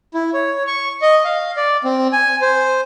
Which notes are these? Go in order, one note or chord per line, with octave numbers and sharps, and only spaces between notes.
E4
C#5
C#6
D#5
F5
D5
C4
G#5
C5